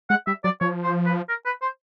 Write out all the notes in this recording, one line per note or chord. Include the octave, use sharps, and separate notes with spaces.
G#3 F#5
G3 E5
F#3 D5
F3 C#5
C5
B4
A#4
B4
C5